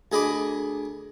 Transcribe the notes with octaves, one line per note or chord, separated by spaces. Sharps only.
D2 G#4 D#5 B5 D6